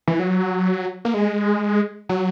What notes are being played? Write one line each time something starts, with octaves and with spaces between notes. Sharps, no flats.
E3
F#3
A#3
G#3
F#3